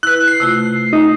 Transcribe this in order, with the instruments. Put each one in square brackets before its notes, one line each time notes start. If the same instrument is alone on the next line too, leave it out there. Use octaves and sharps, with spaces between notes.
[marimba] E4 B4 [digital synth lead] F#6
[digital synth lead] C7
[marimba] C3 A3 F4
[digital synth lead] D#4